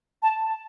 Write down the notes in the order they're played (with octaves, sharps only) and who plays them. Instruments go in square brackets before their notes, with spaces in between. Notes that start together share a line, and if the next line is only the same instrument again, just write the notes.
[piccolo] A5